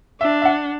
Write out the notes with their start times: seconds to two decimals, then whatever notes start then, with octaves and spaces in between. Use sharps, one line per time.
0.21 D4 E5
0.42 E5
0.45 F#5